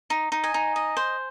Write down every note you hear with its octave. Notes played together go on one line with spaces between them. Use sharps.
D#4
D#4
D#5 G#5
D#4
D#5
C5